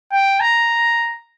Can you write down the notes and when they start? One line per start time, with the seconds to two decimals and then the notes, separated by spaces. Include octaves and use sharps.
0.12 G5
0.41 A#5